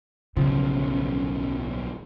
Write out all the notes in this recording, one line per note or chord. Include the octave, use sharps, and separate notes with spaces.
D1 B1 C#3 F3